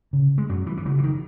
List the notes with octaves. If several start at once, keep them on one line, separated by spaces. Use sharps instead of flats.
C#3
G#3
F#2 F#3
E3
E3
C#3 F#3
E3
D#3